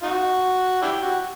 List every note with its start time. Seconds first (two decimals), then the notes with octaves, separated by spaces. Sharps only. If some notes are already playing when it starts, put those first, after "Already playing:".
0.03 D#4 F#4
0.82 D4 E4 G4
1.02 F#4